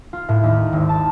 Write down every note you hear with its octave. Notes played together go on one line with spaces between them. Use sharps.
F4
A2
D#2
G#1
A5